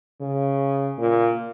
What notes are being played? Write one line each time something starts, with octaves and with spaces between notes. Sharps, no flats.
C#3
A#2